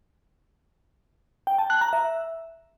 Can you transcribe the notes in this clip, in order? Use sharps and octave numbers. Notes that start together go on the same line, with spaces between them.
G5
A5
F#6
A#5
E5